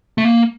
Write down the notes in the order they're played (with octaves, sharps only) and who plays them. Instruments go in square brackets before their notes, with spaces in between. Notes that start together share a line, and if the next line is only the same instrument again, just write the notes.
[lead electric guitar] A3
A#3